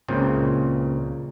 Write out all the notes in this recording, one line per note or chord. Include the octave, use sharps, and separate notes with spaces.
C#2 A#2 C#3 C4